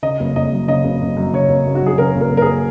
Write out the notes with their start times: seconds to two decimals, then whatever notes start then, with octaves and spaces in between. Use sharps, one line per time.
0.03 C#3 D#5
0.20 F#1
0.36 F#1 D#5
0.52 F#2
0.68 C#3 D#5
0.84 F#1
1.01 F#1
1.17 F#2
1.33 C#3 C#5
1.49 F#1
1.67 F#1
1.75 F#4
1.83 F#2 G#4
1.98 C#3 A#4
2.15 F#1
2.21 A#4
2.31 F#1
2.37 A#4
2.42 G#4